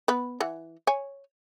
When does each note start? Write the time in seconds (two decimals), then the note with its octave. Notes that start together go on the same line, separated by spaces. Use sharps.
0.08 B3 B4
0.40 E3 F#5
0.87 C#5 G#5